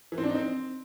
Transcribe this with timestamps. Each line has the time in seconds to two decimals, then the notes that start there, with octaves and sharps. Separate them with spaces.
0.12 E3
0.18 C4
0.24 D4
0.29 D#4
0.35 C4